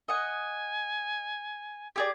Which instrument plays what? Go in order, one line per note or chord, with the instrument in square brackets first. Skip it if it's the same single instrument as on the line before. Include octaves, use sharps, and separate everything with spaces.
[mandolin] D#5 F#5 [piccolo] G#5
[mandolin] G4 G#4 D5